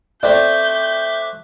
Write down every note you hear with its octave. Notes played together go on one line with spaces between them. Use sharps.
A3 C4 D5 E5 D6 F#6 G6